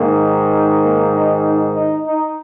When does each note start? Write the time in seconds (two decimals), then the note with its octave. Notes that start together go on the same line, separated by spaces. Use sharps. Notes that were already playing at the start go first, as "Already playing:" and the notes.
Already playing: G#2 D#3 A#3
0.84 A#3
1.14 D#4
1.45 D#4
1.75 D#4
2.06 D#4